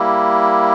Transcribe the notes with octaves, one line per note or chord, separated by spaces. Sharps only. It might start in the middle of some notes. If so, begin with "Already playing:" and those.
Already playing: G3 A#3 E4